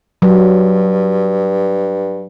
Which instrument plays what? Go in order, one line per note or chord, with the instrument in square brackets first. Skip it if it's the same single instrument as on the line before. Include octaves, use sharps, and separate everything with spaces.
[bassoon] G2 [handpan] F#3